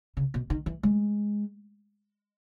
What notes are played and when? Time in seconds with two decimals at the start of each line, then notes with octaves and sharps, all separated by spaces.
0.17 C#3
0.34 B2
0.50 D#3
0.66 E3
0.83 G#3